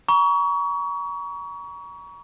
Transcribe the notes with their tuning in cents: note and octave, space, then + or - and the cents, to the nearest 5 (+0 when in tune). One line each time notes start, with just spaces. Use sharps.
A#5 +35 C#6 +30